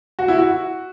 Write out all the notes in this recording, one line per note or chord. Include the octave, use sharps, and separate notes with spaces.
F#4
E4
F#4